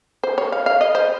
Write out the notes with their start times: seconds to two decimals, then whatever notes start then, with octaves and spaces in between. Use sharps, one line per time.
0.24 C5
0.38 C#5
0.52 F5
0.66 F5
0.81 D#5
0.95 C5